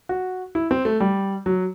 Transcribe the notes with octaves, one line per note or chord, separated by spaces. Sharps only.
F#4
E4
C4
A3
G3
F#3